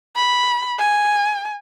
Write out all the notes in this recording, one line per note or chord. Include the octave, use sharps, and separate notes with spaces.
B5
G#5